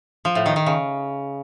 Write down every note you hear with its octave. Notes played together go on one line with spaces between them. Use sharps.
F3
A2
D#3
D#3
C#3